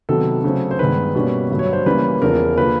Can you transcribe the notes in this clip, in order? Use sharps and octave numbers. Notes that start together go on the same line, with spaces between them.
C3 D#3 F#3 B3 A4
C#3 F#3 A3 C4
C5
G2 D#3 G#3 B3 B4
B2 G3 A#3 C#4
G2 D3 F#3 A3
C#5
C5
C#3 E3 G3 A#3 C#4 B4
E2 C#3 F3 A#4
D3 F3 A#3 B4